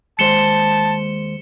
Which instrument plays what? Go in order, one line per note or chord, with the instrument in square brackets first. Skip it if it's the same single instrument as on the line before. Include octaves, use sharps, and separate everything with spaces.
[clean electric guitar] D#2 G#3 C5 [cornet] A5 [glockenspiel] C#7 E7 G7